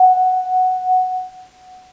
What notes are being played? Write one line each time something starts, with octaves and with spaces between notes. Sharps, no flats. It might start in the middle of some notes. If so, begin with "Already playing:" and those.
Already playing: F#5